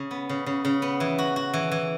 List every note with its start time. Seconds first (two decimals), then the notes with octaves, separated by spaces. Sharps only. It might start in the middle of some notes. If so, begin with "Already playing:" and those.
Already playing: C#3
0.11 B3
0.29 C#3
0.46 C#3
0.65 C#3
0.82 B3
1.00 E3
1.18 F#4
1.36 F#4
1.54 E3
1.72 E3